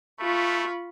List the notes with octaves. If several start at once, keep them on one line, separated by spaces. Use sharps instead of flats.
A3 F4 B5 C#6